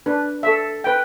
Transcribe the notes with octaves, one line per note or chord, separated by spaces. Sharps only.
D4 B4
A4 E5
B4 G5